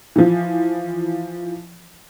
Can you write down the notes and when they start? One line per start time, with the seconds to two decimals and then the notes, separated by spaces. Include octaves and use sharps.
0.16 E3 F3